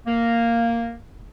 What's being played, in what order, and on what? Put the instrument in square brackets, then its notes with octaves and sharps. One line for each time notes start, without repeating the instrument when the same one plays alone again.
[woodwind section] A#3